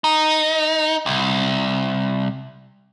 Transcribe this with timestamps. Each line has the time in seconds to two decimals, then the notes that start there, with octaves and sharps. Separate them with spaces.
0.04 D#4
1.06 C2